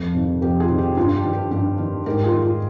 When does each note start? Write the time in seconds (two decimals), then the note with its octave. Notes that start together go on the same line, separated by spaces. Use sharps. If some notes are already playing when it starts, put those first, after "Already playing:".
Already playing: F2
0.15 C3 D#3
0.42 F2 G4
0.60 F4 G#4
0.69 C3 D#3
0.78 G4
0.97 G2 F4
1.15 G4
1.24 D#3
1.33 G4
1.51 G2 G4
1.79 D#3
2.06 G#2 G4 A#4
2.24 F4 G#4
2.33 D#3
2.42 F4